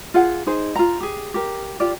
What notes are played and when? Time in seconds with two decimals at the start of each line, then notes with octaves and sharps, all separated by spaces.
0.14 F4 G#4 F#5
0.47 D#4 G#4 C5
0.76 F4 A#5
1.01 G4 G#4
1.34 G4 A#4
1.80 F4 G4 D5